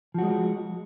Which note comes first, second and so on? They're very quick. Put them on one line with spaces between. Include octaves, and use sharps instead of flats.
F3 F#4 G#3